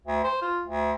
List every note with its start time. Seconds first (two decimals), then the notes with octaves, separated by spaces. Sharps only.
0.06 D2
0.24 C5
0.42 F4
0.65 D2